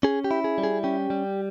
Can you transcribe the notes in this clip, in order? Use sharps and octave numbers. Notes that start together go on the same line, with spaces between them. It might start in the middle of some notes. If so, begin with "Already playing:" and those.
C#4 G#4
G4
E4
G#4
G3
G#4
C#4 G4
G3